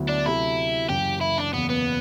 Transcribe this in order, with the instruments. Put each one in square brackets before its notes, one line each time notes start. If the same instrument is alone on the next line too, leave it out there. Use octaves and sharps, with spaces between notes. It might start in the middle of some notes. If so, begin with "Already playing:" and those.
Already playing: [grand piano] D2 D3 F#3 B3 E4
[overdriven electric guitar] D4
[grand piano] D2 C3 F#3 A3 [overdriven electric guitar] E4
[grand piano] F#1 F#2 E3 [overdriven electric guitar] G4
[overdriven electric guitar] E4
D4
[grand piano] F#1 E2 B2 [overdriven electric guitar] B3
[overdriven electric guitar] B3